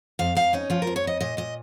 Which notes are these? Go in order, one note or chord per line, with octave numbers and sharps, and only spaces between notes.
F2 F5
F2 F5
C#4 D#4
F3 F4
A#4
F2
C#5
F2 D#5
A#2 D#5
A#2 D#5